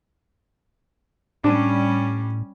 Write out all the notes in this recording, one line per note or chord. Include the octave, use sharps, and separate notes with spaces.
A2 G3 C#4 D4